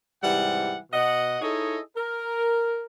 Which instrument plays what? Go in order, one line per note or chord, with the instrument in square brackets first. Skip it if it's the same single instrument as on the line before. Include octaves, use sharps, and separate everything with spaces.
[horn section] G#2 C3 E3 G3 F#5
B2 D#5 F#5
D#4 E4 G#4 A4 C#5 D#5
A#4